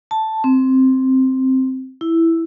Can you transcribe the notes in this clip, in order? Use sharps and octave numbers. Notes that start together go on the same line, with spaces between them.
A5
C4
E4